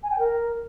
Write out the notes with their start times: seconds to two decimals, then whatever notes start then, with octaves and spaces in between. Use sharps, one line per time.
0.03 G#5
0.11 G5
0.18 A#4